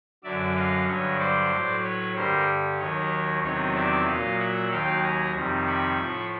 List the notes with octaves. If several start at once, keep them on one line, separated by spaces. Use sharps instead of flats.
F#2 D3 F#3 D5 E5
D#5 F5
G2 D3 F#3 C#5 D#5
C5 D5
A2 F#3
B4 C#5
G2 D3 G3 A#4 C5
D#2 D#3 F#3 C#5 D#5
E2 C3 D#3 F#3 C#5 D#5
D5 E5
A#2 F#3 D#5 F5
E5 F#5
D#2 D#3 F#3 F5 G5
G#5 A#5
F2 C3 D#3 G3
B5 C#6
A2 F3